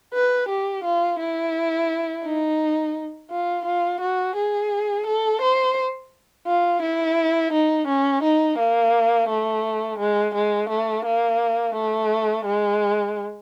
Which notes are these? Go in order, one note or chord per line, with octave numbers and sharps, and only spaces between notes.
B4
G4
F4
E4
D#4
F4
F4
F#4
G#4
A4
C5
F4
E4
D#4
C#4
D#4
A#3
A3
G#3
G#3
A3
A#3
A3
G#3